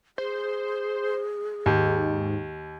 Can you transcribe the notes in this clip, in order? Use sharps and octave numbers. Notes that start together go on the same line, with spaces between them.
G#4 C5
D#2 G#2